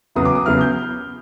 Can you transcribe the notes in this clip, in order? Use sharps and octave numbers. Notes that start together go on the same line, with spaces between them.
E2 C#3 F#3 B3 E4 D#6
D6
D#6
E2 C#3 F#3 B3 E4 F6
G6